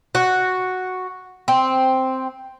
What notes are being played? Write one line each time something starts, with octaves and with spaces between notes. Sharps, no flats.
F#4
C4